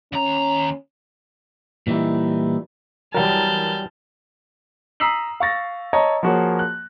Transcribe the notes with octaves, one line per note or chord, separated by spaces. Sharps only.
D#2 C#4 A#5
A#2 E3 G3 D#4 E4
E2 F#3 G3 A#4 A5 F6 G6
A#5 D#6 E6 B6 C7 F#7
F5 C#6 A6 A#6
C#5 D#5 A5 A#5
F3 A#3 F#4 G#4 C#5
F#6